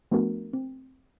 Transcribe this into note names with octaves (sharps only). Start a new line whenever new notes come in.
F3 A3 B3 D4 F#4 A#4
C4